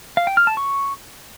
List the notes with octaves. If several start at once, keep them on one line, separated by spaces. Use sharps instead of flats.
F5
G5
F6
A5
C#6